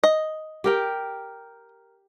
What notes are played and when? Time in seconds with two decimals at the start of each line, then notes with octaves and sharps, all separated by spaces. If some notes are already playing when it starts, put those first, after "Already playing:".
0.04 D#5
0.64 G4 A#4 G5